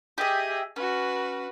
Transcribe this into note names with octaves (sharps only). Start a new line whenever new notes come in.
G4 G#4 D#5 E5
C#4 F#4 B4